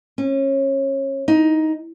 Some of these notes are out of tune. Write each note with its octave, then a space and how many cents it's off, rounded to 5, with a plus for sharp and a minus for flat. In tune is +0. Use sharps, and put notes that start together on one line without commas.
C#4 -25
D#4 +10